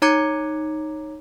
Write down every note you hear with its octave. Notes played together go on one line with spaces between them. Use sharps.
D#4 C#5 A#5 D6 G#6 C#7